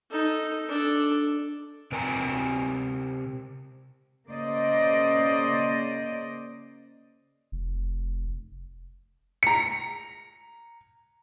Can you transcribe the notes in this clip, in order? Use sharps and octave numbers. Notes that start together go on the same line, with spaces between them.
D#4 A4
D4 A4
C3 C4 A#4 G5 G#5 A#5
C#3 A#3 C5 D5 D#5
F1
A#5 C#7